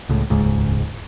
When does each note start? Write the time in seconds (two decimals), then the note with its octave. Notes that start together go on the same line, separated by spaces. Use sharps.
0.09 C#2 A2
0.30 D#1 C#2 G#2